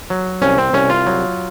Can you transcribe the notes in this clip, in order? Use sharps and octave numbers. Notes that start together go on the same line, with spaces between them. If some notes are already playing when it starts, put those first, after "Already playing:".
F#3
C2 C#4
C4
C2 C#4
F4
F#3